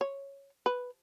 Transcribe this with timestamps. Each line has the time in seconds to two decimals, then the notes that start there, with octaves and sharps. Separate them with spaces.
0.01 C#5
0.66 B4